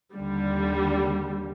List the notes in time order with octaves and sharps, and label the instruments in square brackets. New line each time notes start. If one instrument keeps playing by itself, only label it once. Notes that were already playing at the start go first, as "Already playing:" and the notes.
[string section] D#2 D3 G3